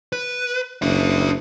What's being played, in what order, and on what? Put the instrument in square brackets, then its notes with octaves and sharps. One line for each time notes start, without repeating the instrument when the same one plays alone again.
[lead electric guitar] B4
[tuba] F#1 [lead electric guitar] D4 E5